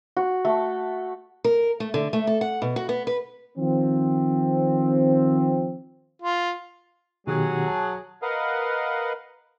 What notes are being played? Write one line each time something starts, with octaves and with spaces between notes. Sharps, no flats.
F#4
A3
A#4
A3
D3
A3
A4
F#5
B2
F#4
B3
B4
D#3 F3 C4
F4
B2 D#3 F#3 G4 G#4
A5
A#4 B4 D#5 F5 F#5